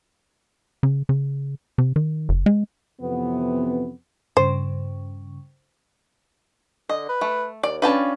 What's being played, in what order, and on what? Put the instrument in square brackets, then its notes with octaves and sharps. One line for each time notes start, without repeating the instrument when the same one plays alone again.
[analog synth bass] C#3
C#3
C3
D#3
F#1
G#3
[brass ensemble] F2 C3 E3 B3
[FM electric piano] G2 C#3 [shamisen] C5
[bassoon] D3 [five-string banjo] D#5
[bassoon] B4
[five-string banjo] A3
[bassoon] D#2 [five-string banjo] D5
[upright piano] C#4 D4 [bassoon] F4 [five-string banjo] B4 G5 A5